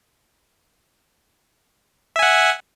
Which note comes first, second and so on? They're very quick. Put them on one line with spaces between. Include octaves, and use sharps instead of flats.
E5 G#5 F#5